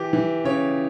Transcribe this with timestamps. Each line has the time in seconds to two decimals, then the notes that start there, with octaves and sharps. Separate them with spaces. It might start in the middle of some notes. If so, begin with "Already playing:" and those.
Already playing: E3 G4
0.13 E3
0.45 C#3 C#5